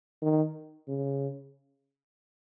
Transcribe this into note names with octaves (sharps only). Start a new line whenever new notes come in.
D#3
C#3